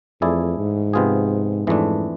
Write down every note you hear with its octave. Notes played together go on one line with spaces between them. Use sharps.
F2 E3 A3 E4 G#4 D5
G#2
C3 F3 B3 F4 G#4
F2 G#2 E3 A3 D4